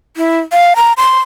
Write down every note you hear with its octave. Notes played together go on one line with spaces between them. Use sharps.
E4
F5
A#5
C6